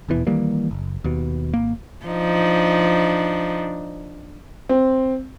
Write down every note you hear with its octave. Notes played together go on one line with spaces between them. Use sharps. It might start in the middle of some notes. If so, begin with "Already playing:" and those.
D#1 E2 B2 E3
D#3 E3 G3 A#3
F#1
D#2 B2
G#1 A#3
F3 D4 D#4
C4